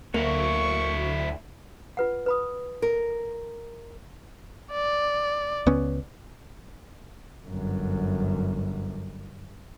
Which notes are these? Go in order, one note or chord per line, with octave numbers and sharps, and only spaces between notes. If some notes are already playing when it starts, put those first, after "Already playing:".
D2 F#3 A#3 E4 C#6
F4 B4 F#5
B4 B5 D#6
A#4
D5
C#2 B3 C#4
G1 F#2